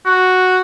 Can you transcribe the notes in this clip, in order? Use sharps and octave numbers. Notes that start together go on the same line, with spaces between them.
F#4